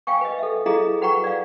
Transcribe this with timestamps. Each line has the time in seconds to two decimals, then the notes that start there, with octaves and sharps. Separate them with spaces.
0.07 F5 G5 G#5 C#6
0.21 B4 D#5
0.39 A4 E5
0.66 E4 G#4 A4 D#5 F5 A#5
1.01 F#4 B4 F#5 G5 A#5 C#6
1.24 D5 F5